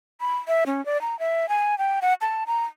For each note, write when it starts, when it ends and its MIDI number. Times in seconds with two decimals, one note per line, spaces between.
0.21 0.37 83
0.48 0.64 76
0.66 0.84 61
0.86 1.00 74
1.01 1.18 82
1.19 1.48 76
1.49 1.78 80
1.78 2.00 79
2.02 2.14 78
2.21 2.44 81
2.47 2.64 82